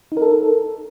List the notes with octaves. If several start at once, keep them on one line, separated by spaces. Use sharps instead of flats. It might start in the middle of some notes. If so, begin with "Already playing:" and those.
D#4
A#4
A4